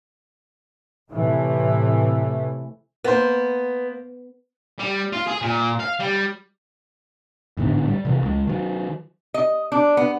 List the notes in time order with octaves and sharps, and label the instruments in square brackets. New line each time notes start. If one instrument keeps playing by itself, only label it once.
[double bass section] A2 C3 E3 A3
[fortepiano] A#3 C5 [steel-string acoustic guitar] B3
[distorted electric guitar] G3
F4
G#4
A#2
F5
G3
[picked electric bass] A1 G#2 D3 B3
G3
C3 E3 F3
C#2 G#3
D#3 F#3
[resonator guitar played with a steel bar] D#5
D4
B3